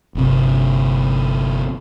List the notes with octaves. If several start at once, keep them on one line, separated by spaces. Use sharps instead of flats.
G1 C3